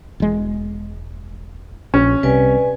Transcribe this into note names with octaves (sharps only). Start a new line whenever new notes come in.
E1 G#3
A#1 C#4
C2 C3 B4 D5 G#5